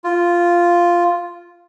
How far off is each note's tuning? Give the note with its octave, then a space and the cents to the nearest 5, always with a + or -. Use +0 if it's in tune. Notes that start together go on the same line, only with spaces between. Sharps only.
F4 -5